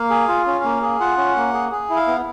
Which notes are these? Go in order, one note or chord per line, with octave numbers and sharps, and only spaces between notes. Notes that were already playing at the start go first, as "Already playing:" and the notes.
Already playing: A#3 F5
G#4
F4
C#4
A#3
G#4
F4 F#5
C#4
A#3
G#4
G#4
E4
F5
B3